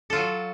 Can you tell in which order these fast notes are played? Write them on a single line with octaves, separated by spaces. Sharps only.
A4 F4 F#3